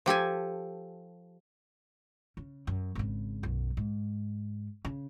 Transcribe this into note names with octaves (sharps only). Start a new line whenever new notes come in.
F3 G4 A4 G#5
C#3
F#2
G#1 C#3
B1 F#2
G#2
C#3